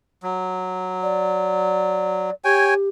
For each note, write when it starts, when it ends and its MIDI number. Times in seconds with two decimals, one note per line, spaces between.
0.23 2.30 54
1.03 2.33 74
2.44 2.89 67
2.44 2.74 73
2.44 2.74 79
2.44 2.74 80